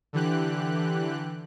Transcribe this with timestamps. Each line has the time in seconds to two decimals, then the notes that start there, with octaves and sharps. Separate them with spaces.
0.13 D3 E3 G4 F#6